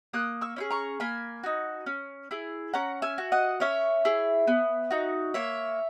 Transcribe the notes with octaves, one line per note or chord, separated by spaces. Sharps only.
A#3 D#6 F#6
C#6 E6
C#4 E4 G#4
A#5 C#6
A#3 G#5 B5
D#4 F#4
C#4
E4 G#4
C#4 F#5 A#5
E5 G#5
F#4
D#5 F#5
C#4 C#5 E5
E4 G#4
B3
D#4 F#4
A#3 C#5 E5